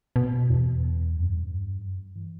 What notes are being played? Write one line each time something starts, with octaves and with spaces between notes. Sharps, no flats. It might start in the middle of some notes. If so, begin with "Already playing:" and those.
B2
E2
F#2
G2
F#2
G2
E3